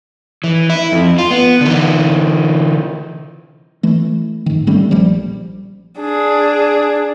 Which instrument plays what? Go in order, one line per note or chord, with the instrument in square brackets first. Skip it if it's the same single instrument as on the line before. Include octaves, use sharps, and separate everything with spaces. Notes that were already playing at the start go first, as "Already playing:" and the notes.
[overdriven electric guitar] E3
E4
F2
F4
B3
D3 E3
[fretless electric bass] E3 A3
G#2 D#3
D#3 G3 A3 C#4
A#1 F3 G3
[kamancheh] D4 G#4